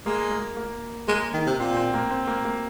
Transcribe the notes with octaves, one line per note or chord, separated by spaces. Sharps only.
G#3 A#3
A#3
A#3
G#3 A#3
D#3
C3
A#2 C4
C4
A#3
C4
A#3
A#3